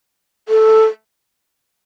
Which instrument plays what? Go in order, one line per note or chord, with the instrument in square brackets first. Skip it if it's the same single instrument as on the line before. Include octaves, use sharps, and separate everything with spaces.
[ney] A4